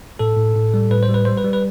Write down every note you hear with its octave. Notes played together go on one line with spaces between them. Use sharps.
A2 A4
A2
A2
G3
A2 B4
C5
G3
B4
G3 C5
B4
G3
B4